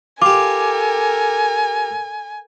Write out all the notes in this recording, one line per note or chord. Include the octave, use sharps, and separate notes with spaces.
F4 G4 A4 A#4 G#5 D6